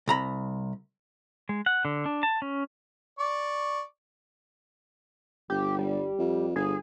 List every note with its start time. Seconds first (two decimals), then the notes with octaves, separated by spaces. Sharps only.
0.08 C2 A#5 B5
1.49 G#3
1.66 F#5
1.85 D3
2.06 D4
2.23 A5
2.42 C#4
3.19 D5 C#6
5.50 G1 G4
5.79 G3
6.18 F2
6.56 G1 G#4